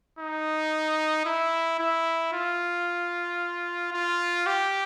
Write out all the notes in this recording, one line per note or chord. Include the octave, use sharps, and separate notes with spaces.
D#4
E4
E4
F4
F4
G4